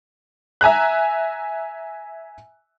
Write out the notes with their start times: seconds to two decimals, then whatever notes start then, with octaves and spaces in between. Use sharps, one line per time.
0.61 E5 G#5 A#5 F#6